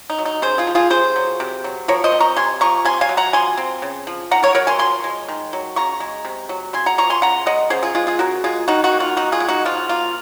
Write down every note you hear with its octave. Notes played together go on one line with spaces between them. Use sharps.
D#4
F#3
D#4
C#3 G#4 C5
F4 G#4
F3
F4 G#4
C3 G#4 C5
F#3
C3
F#3
F3 A#4 C#5
C5 D#5
C4
A#5 C#6
C3 G#5 C6
F3 A#5 C#6
C3 G#5 C6
F5 G#5
F#3
F#5 A#5
F3 G#5 C6
C4
C#3
F3
D#3 F#5 A#5
A#4 C#5
F#3 A#4 C#5
G#5 C6
F3 G#5 C6
G#3
D#3
F#3
C#3 A#5 C#6
G#3
C3
F#3
C#3 G#5 C6
F#5 A#5
F3 A#5 C#6
G#5 C6
C#3 F#5 A#5
G#3 D#5 F#5
C#3 G#4 C5
F4 G#4
G#3 F4 G#4
F4 G#4
C#3 F#4 A#4
G#3 F4 G#4
D#3 D#4 F#4
D#4 F#4
A#3
F4
D#3 D#4 F#4
F4 G#4
G#3
D#4 F#4
F3 F4
A#3 F4